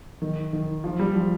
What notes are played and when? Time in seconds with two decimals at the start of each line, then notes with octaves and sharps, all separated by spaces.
0.22 D#3
0.53 D#3
0.84 F3
0.99 G3
1.15 F3